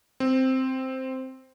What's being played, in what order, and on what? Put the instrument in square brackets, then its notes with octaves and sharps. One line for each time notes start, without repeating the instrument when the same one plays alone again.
[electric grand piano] C4